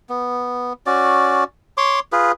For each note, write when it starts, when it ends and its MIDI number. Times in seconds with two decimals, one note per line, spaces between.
0.09 0.73 59
0.86 1.44 61
0.86 1.44 66
0.86 1.44 74
1.77 2.00 73
1.77 2.00 84
1.77 2.00 86
2.12 2.32 65
2.12 2.32 68
2.12 2.32 71